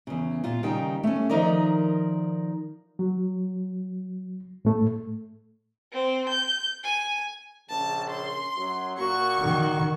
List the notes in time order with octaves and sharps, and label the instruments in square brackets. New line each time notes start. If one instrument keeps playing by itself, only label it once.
[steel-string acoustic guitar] E2 C#3
A#2 F4
D#2 C#3 G3 D#4 G5
A3 C#4
D#3 F3 D#4 A#4 D5
[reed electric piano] F#3
A2 A3
[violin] C4
G6
G#5
[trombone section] A#1 C#3 [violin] A5
[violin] C6
[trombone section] F#2 F#3
[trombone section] A#2 A#3 F#4 [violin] C#6
[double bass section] D#3